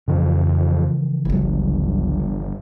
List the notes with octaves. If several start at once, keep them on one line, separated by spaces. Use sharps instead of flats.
F2 C#3 E3 F3
G1 C#2 F#3